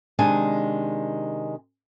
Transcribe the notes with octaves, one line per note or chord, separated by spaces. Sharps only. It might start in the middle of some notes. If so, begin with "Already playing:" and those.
C3 D#3 G#3 D4 G#5